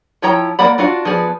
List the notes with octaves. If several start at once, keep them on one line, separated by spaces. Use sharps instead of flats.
F3 E4 C#5 G5 A#5
A#3 D5 F#5 B5
D4 F4 F#4 F5 F#5
F3 B3 G#4 D5